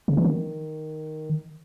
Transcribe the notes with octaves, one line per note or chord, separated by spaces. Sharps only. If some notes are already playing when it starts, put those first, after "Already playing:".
C#3
E3
D#3